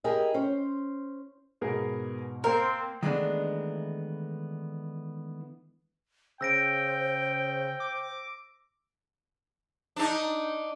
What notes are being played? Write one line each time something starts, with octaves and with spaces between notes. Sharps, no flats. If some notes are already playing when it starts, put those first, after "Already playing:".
E4 G4 G#4 A#4 D#5
C#4 C5
G#2 B2 B3 G#4 A#4
A#3 C4 A#4
D#3 E3 G#3 A3 B3 D4
C#3 C5 G5 E6 A#6 D7
D6
D4 D#4